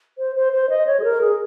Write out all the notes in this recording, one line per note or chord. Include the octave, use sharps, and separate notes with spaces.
C5
C5
C5
D#5
C#5
G#4
A#4
G#4